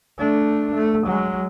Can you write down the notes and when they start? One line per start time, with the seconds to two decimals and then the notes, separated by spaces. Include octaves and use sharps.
0.18 A3 D4
0.75 A3
1.06 F#3 G#3